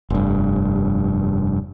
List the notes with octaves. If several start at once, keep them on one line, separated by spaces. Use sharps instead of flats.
F1 G2